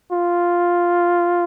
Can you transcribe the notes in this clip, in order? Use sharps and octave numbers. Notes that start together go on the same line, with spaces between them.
F4